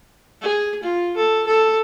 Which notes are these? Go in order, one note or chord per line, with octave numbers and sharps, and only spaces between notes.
G#4
F4
A4
A4